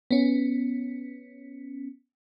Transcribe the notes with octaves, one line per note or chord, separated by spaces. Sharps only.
B3 C#4